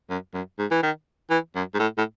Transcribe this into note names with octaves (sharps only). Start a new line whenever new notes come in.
F#2
F#2
G#2
E3
D#3
E3
F#2
G#2
A2
A2